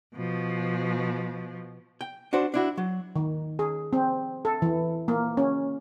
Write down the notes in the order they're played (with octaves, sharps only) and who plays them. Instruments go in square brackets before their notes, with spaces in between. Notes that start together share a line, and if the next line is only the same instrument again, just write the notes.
[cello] B2 F3
[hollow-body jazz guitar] G5
D4 F#4 C5
D4 E4 F#4
F#3
[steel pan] D#3
G#4
C4
A4
E3
A#3
C#4